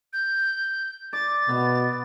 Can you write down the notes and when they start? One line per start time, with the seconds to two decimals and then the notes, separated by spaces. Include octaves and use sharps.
0.13 G6
1.13 D5 A6
1.49 B2 B3